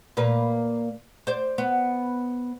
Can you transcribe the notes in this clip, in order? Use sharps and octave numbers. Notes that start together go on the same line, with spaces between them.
A#2 A#3 B4
C5 D5
B3